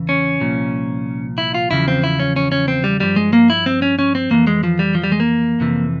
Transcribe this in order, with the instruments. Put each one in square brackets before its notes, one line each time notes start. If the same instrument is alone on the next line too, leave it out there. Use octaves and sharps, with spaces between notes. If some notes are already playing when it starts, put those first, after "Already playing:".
Already playing: [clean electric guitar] E2 C#3 E3
C#4
C2 A#2 F3
E4
F4
E2 C#3 F3 E4
C4
E4
C#4
C#4
C#4
C4
G3
G2 F3 G3
G#3
A#3
E4
C4
C#4
C#4
C4
F2 E3 A#3
G#3
F3
G3
F3
G3
G#3
A#3
F2 C3 E3